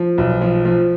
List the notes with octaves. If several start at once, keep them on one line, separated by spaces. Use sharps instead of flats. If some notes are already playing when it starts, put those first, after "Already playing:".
Already playing: F3
B1
F3
F3